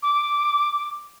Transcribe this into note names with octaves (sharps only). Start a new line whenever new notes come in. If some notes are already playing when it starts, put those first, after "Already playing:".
D6